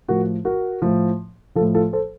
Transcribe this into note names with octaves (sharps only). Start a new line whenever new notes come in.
A2 F3 F#4 A#4
F#4 A#4
A2 F3
A2 F3 F4 A4
F4 A4
A4 C5